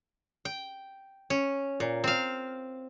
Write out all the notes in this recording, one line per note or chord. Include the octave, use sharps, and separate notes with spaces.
G5
C#4
A#2
C4 F5